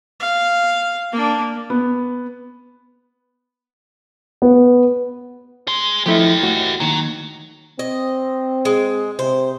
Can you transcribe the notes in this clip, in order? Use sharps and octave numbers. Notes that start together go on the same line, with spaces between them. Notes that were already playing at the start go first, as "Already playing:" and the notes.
F5
A#3 D4
B3
B3
G#4 C6
F3 A3 E4 G4 D#5
A2 F#4
D#2 D#3 F#3
C4 D#5
G#3
C3 C5